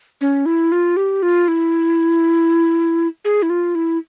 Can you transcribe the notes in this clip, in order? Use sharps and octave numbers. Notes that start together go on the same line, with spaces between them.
C#4
E4
F4
G4
F4
E4
G#4
E4
F4
E4